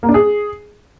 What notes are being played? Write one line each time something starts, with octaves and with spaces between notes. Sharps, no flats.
A#3
D4
G#4